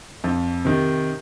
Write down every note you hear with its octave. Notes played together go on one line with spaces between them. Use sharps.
F2
C3 D#3